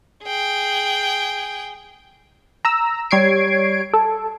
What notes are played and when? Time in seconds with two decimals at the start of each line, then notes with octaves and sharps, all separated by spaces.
0.23 G#4 G5
2.65 A#5 E6
3.11 G3 C#5 G#6 C7 D7
3.94 A4